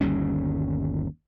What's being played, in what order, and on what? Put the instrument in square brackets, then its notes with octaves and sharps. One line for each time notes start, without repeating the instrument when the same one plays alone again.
[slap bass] G1 D#2 G3 C#4